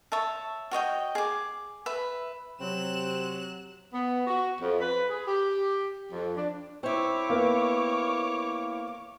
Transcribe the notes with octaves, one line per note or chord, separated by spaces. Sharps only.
C#5 E5 A5
F#4 C#5 D#5 G5
G#4 D6
B4 E5 B5
C3 F#3 C4 F#6 E7
B3
F#4
F2
B4
G#4
G4
F2
D4
C4 E4 C#5 D6
A#3 B3